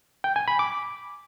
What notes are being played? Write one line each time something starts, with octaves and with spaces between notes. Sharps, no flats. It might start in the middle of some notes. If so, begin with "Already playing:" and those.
G5
G#5
B5
D6